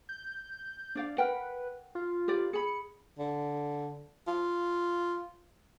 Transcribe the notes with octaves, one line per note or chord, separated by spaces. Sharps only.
G6
D4 D5 F5
A#4 B4 F#5 G5
F4
G4 B4 D5
G#4 B5 C#7
D3
F4